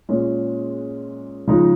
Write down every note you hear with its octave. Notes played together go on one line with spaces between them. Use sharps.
A#2 G#3 C#4
C#3 F3 G#3 D#4